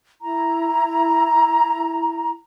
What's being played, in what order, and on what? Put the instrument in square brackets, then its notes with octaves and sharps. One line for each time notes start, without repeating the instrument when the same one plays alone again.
[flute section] E4 A#5